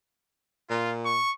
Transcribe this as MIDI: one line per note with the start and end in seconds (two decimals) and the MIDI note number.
0.70 1.21 46
0.70 0.94 65
1.06 1.33 85